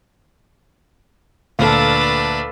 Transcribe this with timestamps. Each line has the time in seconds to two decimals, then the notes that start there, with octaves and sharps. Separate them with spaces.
1.59 D2 A#2 D4 A4 B4 F5